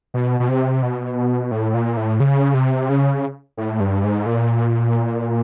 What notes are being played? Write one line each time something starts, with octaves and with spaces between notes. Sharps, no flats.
B2
B2
C3
B2
A2
A#2
A2
C#3
C3
C#3
A2
G2
G#2
A#2